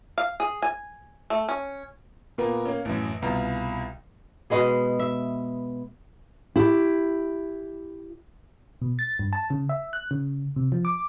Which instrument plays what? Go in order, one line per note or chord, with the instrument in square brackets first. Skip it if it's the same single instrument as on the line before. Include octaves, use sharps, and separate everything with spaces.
[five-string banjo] F5
G#4
G#5
A3
C#4
[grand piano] A#2 A#3 B3 A#4
A#3 C#4
A1 F#2
C2 B2 F4 A#5
[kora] B2 G#3 B3 G#4
E5
[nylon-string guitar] E4 G4
[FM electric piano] B2
A6
G2
A5
C#3
E5
F#6
C#3
C3
F3
D6